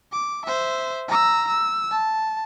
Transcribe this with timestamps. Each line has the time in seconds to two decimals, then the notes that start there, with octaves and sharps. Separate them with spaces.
0.13 D6
0.46 C5 E5
1.08 A#5 E6
1.48 E6
1.91 A5